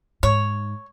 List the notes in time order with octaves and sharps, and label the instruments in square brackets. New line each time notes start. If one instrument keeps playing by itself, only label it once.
[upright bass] G#2 [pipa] C#5